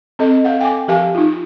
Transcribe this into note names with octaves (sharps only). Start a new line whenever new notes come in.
C4 A4 D#5
A4 F5 F#5
G5 G#5 D6
F3 G4 A#4 F5 G#5 A5
D#4 F4